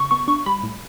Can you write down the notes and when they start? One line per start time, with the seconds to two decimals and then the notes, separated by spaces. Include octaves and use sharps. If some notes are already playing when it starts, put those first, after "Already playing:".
Already playing: C#3 C#6
0.11 B3 C#6
0.28 D4 C#6
0.46 G3 B5
0.63 A2